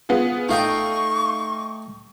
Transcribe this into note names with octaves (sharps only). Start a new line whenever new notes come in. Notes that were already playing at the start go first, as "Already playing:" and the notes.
B3 F4 G#4
A3 D#4 D#5 F5 G5 C#6